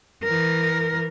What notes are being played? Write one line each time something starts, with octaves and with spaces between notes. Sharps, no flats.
E3 A#4